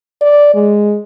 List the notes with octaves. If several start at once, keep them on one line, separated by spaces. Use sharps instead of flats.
D5
G#3